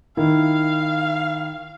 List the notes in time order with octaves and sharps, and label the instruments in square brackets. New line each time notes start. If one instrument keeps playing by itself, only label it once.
[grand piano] D#3 E4 [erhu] F5